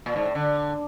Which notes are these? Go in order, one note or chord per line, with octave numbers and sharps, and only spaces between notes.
A#2
G#2
A2
D3